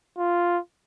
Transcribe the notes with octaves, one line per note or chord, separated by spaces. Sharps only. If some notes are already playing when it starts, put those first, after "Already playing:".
F4